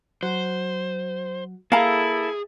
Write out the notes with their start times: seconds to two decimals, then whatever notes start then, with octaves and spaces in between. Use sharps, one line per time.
0.23 F#3 C5
1.72 A#3 E4 G#4 A4 F5 A#5